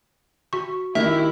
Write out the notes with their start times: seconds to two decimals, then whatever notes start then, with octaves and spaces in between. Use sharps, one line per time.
0.53 F#4 C#6
0.95 D#3 E4 G4 E5